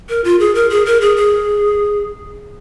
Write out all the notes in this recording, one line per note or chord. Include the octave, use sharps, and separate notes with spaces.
A#4
F4
G#4
A#4
G#4
A#4
G#4
G#4